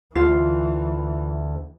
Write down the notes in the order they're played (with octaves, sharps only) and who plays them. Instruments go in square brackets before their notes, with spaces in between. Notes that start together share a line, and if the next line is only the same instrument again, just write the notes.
[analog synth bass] D2 [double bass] E3 [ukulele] F4